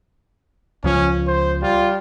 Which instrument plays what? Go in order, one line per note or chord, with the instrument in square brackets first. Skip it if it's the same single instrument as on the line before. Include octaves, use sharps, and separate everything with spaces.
[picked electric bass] C#2 F3 [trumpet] C#4
[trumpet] C5
[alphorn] G3 [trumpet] F4